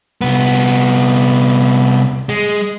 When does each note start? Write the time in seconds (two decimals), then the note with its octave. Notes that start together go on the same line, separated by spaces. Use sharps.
0.21 C2 B3
2.29 G#3